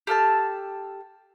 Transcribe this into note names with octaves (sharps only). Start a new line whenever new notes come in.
G4 A4 F5 A5